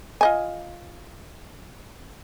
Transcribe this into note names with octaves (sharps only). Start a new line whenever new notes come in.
F4 D#5 G#5